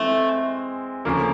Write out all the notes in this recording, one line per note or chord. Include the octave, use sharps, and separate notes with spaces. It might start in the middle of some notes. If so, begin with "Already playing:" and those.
Already playing: E3 G#3 A3 C4
D2 C#3 F3 A#3